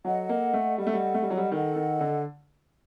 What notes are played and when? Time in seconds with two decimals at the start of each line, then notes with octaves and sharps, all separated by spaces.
0.05 F#3 A4 D#5 F#5
0.29 A#3
0.54 A3
0.78 G3 A4 D#5 F#5
0.87 A3
0.93 G3
1.14 A3
1.22 G3
1.30 F#3
1.37 G3
1.51 D#3 A4 D#5 F#5
1.76 D#3
2.01 D3